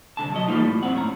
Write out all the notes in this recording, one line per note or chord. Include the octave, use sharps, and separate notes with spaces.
C2 D3 A5
B1 F#3 D#5
E3 G3 A#3 C4 D#4 F4
A2
F2 A#2 C4 F#5
A2 C#4 A#5